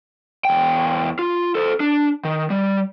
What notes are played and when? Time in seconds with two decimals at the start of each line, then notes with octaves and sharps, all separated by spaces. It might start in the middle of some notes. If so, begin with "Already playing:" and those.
0.45 E2 G5
1.19 F4
1.55 A4 C5
1.80 D4
2.25 D#3
2.50 G3